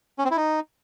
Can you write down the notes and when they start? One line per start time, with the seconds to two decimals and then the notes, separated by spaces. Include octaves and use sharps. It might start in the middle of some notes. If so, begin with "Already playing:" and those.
0.19 C#4
0.25 C4
0.31 E4
0.37 D#4